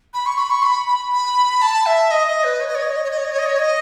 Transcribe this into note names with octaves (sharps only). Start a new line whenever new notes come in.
B5
C#6
B5
C#6
B5
B5
B5
A5
E5
D#5
D#5
B4
C#5
D#5
C#5
D#5
C#5
D#5
C#5
D#5
C#5
D#5
C#5
D#5
C#5
D#5